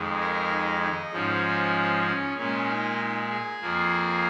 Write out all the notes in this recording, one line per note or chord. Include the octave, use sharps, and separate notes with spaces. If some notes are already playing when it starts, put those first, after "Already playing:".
Already playing: F2 D#3 G#3
A#4
D#4
D#4
G#2 F3 G#3 C#4
C#4
A#2 G#3 C#4
D#4
G#4
F2 F3 A#3